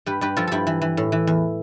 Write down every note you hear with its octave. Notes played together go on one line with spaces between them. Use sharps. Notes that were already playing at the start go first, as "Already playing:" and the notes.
G2 G4 B4
G2 G4 B4
F3 F4 A4
G2 E4 G4 A4
E3
E3
A2
E3
E2